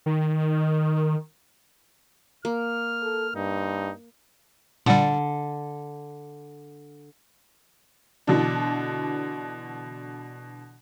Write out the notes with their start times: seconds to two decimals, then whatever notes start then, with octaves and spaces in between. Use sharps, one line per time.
0.06 D#3
2.45 A#3 F6
3.02 A4
3.35 G2 D#4
4.86 A#2 D3 G3
8.27 B2 D3 E3 D4